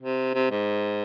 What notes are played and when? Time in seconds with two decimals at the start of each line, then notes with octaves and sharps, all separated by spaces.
0.01 C3
0.34 C3
0.51 G#2